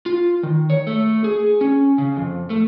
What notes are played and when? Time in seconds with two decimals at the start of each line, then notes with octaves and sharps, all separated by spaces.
0.06 F4
0.43 D#3
0.70 C#5
0.87 A3
1.24 G#4
1.61 C#4
1.98 C#3
2.16 F2
2.50 A3